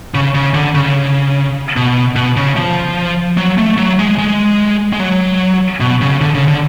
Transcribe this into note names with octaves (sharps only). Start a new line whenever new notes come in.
C#3
C#3
D3
C#3
B2
B2
C#3
F3
F#3
A3
F#3
G#3
G#3
G#3
F#3
B2
C#3
D3
C#3
D3